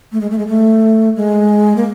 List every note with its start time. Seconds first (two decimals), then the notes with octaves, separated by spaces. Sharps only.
0.12 A3
0.21 G#3
0.30 A3
0.38 G#3
0.47 A3
1.16 G#3
1.76 A#3